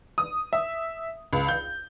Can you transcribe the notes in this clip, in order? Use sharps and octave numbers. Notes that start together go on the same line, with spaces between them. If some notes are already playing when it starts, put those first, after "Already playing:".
D#6
E5
C#2
G6